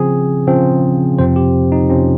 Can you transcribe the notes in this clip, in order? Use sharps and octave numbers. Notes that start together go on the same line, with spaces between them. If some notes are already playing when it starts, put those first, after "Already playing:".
Already playing: C#3 F3 C4 G#4
C#3 F3 C4
F2 C3 F3 C4 C5
G4
D#4
F2 C3 F3 C4 C#4